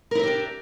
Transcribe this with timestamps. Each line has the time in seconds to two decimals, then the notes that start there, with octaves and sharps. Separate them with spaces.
0.11 A#4
0.15 E4
0.19 E5
0.23 G4
0.27 D4